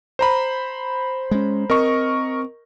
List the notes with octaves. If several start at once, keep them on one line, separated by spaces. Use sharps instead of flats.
C5 A#5 B5
G#3 C#4
C4 A#4 D#5 C#6